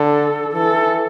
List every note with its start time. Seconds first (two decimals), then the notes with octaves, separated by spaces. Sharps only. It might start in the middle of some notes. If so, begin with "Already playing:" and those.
Already playing: D3 A4
0.53 E3 A4